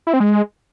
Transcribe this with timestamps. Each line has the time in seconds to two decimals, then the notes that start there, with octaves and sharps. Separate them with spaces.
0.07 E4
0.13 C4
0.20 G#3